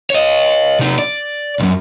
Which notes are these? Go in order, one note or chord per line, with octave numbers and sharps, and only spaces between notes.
C#5 D#5
C3 D#4
D5
B1 F#2